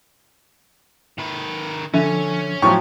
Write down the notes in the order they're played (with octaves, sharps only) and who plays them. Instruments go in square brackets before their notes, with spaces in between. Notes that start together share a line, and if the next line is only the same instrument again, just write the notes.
[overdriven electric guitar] D#3 B4
[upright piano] D3 [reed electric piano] F3 [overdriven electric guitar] C#4 [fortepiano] E5
[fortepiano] A2 F3 F#3 [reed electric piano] G5 [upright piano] C#6